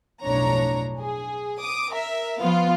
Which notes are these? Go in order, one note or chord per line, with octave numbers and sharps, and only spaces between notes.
B1 F2 A2 D4 C#5 A#5
G#4
D6 D#6
A#4 E5
F3 B3 F4 F5